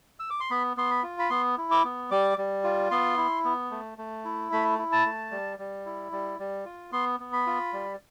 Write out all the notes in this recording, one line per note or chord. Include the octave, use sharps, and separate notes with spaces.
E6
D6
C6
B3 B5
B3 C6
B5
F4
B5
B3 C6
E4
D6
B3
G3 D6
G3
F4
B3 C6
E4
B3
A3
A3
E4
A3 B5
E4
A5
A3
G3
G3
E4
G3
G3
F4
B3 C6
B3
B5
F4
G3